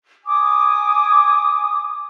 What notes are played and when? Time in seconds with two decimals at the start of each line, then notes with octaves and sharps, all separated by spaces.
0.25 G#5 D6 D#6